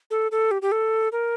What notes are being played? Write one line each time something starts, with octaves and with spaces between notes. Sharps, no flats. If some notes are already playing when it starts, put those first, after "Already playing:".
A4
A4
G4
G4
A4
A#4